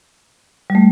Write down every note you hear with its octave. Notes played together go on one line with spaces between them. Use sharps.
G3
A3